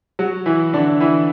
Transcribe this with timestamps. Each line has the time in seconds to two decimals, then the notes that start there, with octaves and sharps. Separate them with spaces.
0.19 F#3 F#4
0.46 E3 E4
0.73 D3 D4
1.00 E3 E4